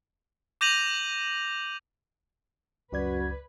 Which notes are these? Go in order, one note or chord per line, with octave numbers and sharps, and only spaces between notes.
D6 G6 A#6 D#7 F7 F#7
C#2 F#2 F#4 B4 D5 G#6